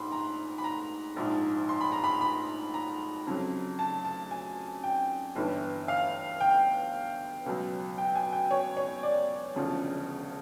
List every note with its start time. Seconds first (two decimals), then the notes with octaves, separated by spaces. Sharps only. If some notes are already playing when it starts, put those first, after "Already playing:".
Already playing: A#1 G#2 B5 C6
0.12 A#5
0.58 B5
0.64 A#5
1.16 A#1 G#2 F3
1.69 C6
1.81 B5
1.92 A#5
2.04 B5
2.21 B5
2.74 A#5
3.27 F2 C#3 F#3
3.79 A5
4.05 A5
4.31 G#5
4.84 G5
5.36 G1 G2 E3
5.88 F5
6.40 G5
7.46 C#2 B2 F#3
7.98 G5
8.15 G#5
8.33 G5
8.51 C#5
8.77 C#5
9.03 D5
9.55 E1 D2 C#3 F3